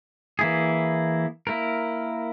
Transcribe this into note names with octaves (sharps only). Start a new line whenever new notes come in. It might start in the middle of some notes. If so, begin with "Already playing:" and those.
E3 A#3 E4 G#4
A#3 E4 A#4